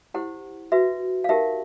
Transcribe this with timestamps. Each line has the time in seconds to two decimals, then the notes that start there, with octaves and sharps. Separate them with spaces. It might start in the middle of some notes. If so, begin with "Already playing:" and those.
0.14 E4 G4 C5 F#5
0.72 F#4 B4 E5
1.24 F5
1.29 D#4 G4 A#4 E5